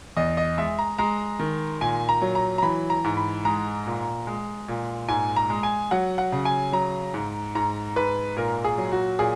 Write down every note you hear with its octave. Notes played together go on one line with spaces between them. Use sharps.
E2 D#5
D#5
G#3 E5
A#5
G#3 A#5
D#3
A#2 G#5
A#5
F#3
A#5
A#5
E3 B5
A#5
G#2
B5
G#3 A#5
A#2
G#3
A#2
G#2 G#5
A#5
G#3
G#5
F#3 F#5
F#5
C#3
G#5
F#3 A#5
G#2
G#2 A#5
G#2 B4
A#2 A#4
G#4
F#3
F#4
A#2 G#4